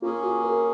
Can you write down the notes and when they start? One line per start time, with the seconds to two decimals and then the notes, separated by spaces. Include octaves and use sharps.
0.02 A#3 C#4 F4 G#4
0.23 F#4
0.44 A#4